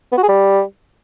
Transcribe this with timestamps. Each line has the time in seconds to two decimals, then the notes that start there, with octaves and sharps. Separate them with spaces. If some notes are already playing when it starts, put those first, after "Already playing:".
0.12 B3
0.18 F#4
0.23 G#4
0.28 G3